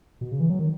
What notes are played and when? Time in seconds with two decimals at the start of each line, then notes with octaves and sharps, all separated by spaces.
0.21 B2
0.31 C#3
0.40 E3
0.49 F#3
0.59 D#3